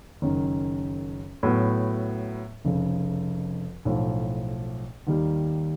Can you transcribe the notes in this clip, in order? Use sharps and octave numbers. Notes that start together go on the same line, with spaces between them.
F#1 F#2 D#3
A2 F#3 B3
F1 F2 C#3
B1 A2 F3
D#2 D#3 G3